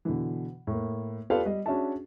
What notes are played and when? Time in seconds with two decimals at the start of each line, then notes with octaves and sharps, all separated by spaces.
0.05 B2 D3 E3
0.67 A2 A#3
1.30 F4 G4 A4 B4 D5 F5
1.45 G3 D#5
1.66 C#4 D4 F#4 G#4 E5 A5